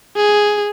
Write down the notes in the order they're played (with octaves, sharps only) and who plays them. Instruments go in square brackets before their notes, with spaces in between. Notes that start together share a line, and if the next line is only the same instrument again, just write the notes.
[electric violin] G#4